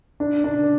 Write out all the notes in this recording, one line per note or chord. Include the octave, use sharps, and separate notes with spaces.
D4
D4